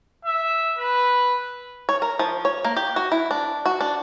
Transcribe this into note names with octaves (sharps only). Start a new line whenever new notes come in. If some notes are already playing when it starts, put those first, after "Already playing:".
E5
B4
C#5
A#4
F3
C#5
A#3
G4
F#4
E4
D4
F#4
D4